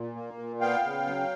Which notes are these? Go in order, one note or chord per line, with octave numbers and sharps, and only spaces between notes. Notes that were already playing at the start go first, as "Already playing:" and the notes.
Already playing: A#2
A#3
A#2
B3 F5 G5
C#3
F#3